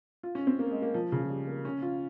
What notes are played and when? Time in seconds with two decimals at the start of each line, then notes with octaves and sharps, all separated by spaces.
0.23 F4
0.35 C#4
0.47 C4
0.59 A#3
0.71 G#3
0.82 A#3
0.94 F3
1.12 C#3
1.23 F3
1.30 G3
1.47 A#3
1.65 C#4
1.82 F4